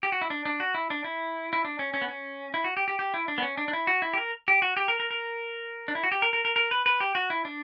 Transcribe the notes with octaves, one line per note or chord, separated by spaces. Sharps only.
G4
F#4
E4
D4
D4
F#4
E4
D4
E4
E4
D4
C#4
C#4
B3
C#4
E4
F#4
G4
G4
G4
E4
D4
B3
C#4
D4
D4
E4
F#4
E4
G4
A#4
G4
F#4
G4
A#4
A#4
A#4
D4
E4
F#4
G4
A#4
A#4
A#4
A#4
B4
B4
G4
F#4
E4
D4